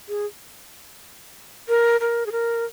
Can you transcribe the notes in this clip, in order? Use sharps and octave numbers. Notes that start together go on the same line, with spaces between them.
G#4
A#4
A#4
G#4
A#4